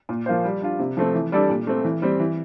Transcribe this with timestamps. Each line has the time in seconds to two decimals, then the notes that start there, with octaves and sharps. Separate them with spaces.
0.09 A#2
0.26 F3 A#3 F4 C5
0.44 G3
0.61 D4 F4
0.79 C3
0.97 F3 A3 C4
1.14 E3
1.32 G3 D4 A4 D5
1.50 A#2
1.67 A3 C4
1.84 E3
2.02 G3 C4
2.20 E3